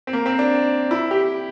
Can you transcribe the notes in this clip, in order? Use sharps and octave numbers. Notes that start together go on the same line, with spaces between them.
C4
A#3
C4
D4
E4
G4